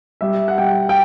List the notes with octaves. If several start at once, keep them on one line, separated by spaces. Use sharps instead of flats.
G3 E5
F#5
G3 G5
G5